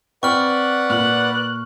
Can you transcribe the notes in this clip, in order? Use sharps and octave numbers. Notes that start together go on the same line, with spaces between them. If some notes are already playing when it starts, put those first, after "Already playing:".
C4 B4 D5 F#5 G5 C#6 F6
A#2 F#6